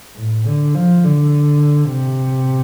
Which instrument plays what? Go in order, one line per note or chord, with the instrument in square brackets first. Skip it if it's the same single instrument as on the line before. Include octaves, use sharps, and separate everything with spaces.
[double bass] A2
D3
F3
D3
C3